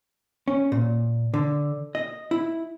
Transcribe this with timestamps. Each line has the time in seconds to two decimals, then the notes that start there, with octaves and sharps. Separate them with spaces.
0.48 C#4
0.72 A#2
1.34 D3
1.95 D#5
2.31 E4